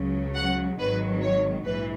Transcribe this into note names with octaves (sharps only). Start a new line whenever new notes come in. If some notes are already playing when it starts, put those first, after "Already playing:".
Already playing: C#2 C#3 F#3
F#5
G#1 G#2 D#3 F#3 B4
C#5
A#1 G#2 E3 B4